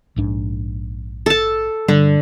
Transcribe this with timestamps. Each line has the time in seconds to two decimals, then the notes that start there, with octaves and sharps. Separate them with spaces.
0.16 A#1 G#2 D4
1.26 A4 A5
1.88 G2 D3 G3